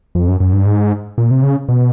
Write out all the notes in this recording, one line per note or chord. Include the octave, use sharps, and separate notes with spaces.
F2
F#2
F#2
G2
G#2
A#2
C3
C#3
B2